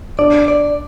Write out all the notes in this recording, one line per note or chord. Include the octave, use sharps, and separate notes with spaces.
D4 D5
D5